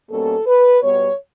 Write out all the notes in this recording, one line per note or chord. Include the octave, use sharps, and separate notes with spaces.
B2 G3 A#3 C#4 A4
B4
B2 G3 B3 C#5